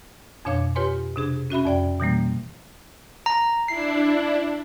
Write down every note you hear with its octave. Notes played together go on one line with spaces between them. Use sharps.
F2 B2 D4 C#5 F5 D6
F4 G4 B4 C#5 G#5 C6
C3 D4 G#4
C#4 F#4 E5 B5
F2 D5 G5
B2 E3 G3 A#3
A#5
D4 E4 C7